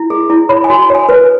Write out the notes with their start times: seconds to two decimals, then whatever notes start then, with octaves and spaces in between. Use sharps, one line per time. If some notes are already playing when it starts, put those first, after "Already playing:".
Already playing: E4
0.10 G#4
0.30 E4
0.49 C#5 B5
0.64 G#5
0.70 F#4
0.90 C#5 G#5
1.09 B4